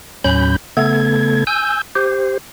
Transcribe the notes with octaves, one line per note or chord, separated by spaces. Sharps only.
D#2 A2 F#3 C#4 B5 G6
C#3 A3 B3 A4 G#6
G#5 E6 G6
G4 C5